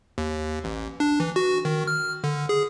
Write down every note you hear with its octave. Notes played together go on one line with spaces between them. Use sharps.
D#2
A1
D4
E3
F#4
D#3
F6
D3
G#4